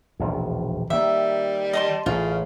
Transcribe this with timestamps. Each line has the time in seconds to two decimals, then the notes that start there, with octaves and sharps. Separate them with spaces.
0.20 E1 A#1 D#2
0.90 D#3 G3 A#3 E5
1.73 D#5 A5 C6
2.06 A1 C#3 F4